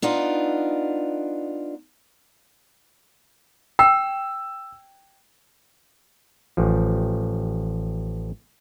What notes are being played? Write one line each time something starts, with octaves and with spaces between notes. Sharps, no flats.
B3 D4 D#4 F4
G5 E6
A1 F3